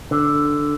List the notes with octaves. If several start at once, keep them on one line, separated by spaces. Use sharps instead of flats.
D3